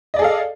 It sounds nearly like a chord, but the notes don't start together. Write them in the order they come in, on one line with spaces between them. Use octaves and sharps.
D#5 D5 G#4 A4 F5